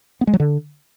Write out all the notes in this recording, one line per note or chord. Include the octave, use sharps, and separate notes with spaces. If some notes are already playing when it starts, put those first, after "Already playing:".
B3
G#3
F#3
D3